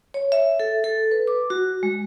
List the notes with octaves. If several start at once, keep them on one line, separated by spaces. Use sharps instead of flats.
C#5
E5
A4
A4
B4
D6
F#4
G#3